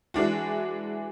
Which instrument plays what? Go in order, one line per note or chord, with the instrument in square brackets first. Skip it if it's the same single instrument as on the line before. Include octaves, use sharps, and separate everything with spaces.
[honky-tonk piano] E3 G#3 D4 F#4